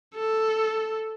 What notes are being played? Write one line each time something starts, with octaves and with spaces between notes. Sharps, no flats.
A4